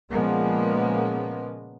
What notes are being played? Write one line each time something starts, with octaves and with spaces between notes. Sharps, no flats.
A#2 C#3 F3 G#3 A#3 B3